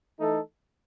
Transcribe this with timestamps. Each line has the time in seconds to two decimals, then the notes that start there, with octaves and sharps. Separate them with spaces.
0.20 E3 A3 D#4 A4